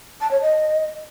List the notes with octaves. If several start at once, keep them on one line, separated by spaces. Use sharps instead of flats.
A5
C#5
D#5